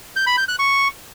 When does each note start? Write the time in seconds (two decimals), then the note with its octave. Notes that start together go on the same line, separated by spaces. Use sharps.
0.16 G6
0.27 B5
0.38 G6
0.48 F#6
0.59 C#6